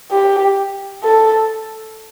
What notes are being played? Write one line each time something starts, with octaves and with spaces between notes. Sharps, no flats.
G4
A4